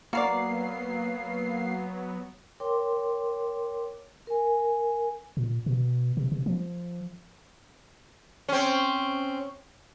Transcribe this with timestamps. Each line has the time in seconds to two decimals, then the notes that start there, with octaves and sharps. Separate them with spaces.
0.13 F#3 A#3 B3 F#4 A#4 D5 F5 C7
2.60 A#4 C#5 G5 C6 D6
4.27 A#4 G#5
5.37 A#2
5.66 B2
6.17 C3
6.32 C3
6.46 F3
8.49 C4 C#4